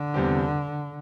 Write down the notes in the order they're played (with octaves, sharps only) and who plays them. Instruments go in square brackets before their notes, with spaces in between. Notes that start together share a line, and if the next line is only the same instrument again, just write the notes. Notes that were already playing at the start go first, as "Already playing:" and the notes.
Already playing: [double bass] D3
[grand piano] E2 C3 G3 C4 G4